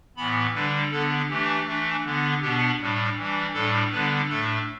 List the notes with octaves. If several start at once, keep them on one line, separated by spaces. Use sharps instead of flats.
A2 E3 B3 B5
D3 G3 D4 B4
D3 B3 D4 A4
E3 A3 D4 G4
E3 A3 D4
D3 B3 D4
B2 B3 D4 G4
A2 G3 D4
E3 G3 D4
A2 G3 D4 A4
D3 G3 B3 D4 B4
A2 A3 D4 A4